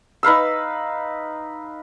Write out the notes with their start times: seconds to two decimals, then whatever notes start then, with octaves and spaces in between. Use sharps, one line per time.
0.23 D#4 B4 F5 E6